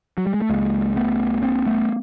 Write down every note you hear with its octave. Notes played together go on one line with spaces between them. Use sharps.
F#3
G3
G#3
A3
C#2 C#3 G#3 A#3
A3 B3
A#3 C4
A3 B3